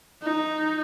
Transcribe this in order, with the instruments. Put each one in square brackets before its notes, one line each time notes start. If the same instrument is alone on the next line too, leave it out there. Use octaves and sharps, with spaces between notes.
[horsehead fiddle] D#4